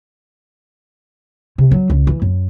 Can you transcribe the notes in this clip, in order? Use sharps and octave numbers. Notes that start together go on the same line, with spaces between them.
C3
F#3
C#2
E3
F#2